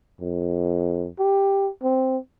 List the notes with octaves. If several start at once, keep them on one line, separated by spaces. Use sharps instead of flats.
F2
G4
C4